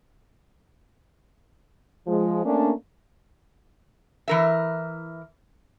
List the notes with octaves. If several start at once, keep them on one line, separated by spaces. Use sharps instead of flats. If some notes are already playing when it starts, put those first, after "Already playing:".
F3 G#3
A3 A#3 C#4 D4
E3 A#4 E5